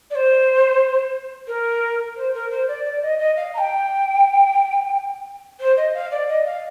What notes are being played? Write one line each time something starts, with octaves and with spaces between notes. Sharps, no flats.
D5
C5
A#4
C5
A#4
C5
D5
D5
D#5
D#5
F5
A#5
G5
C5
D#5
F5
D5
D#5
F5